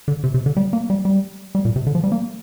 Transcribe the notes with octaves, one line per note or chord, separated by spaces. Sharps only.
D3
C3
C3
D3
G3
A#3
G3
G3
G3
A#2
C3
D3
F3
G3
A#3